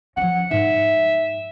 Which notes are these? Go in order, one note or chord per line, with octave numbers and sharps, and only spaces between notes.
F3 C#4 F#5
G#2 E5